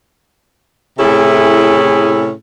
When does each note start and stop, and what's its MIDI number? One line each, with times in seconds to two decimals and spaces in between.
0.98 2.30 45
0.98 2.30 48
0.98 2.30 61
0.98 2.30 64
0.98 2.30 68
0.98 2.30 69